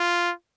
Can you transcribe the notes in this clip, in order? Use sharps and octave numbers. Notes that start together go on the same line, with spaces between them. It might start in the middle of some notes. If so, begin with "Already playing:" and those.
Already playing: F4